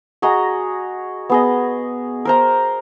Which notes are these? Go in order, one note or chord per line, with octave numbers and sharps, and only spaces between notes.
F#4 G#4 D#5 A#5
B3 G#4 D#5
A#4 C5 A#5